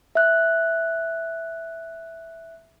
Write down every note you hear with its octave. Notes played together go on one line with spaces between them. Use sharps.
E5 F#6